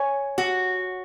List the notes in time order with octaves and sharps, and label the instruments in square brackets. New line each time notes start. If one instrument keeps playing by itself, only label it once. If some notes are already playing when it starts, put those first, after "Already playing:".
Already playing: [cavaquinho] C#5 G#5
[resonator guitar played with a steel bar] F#4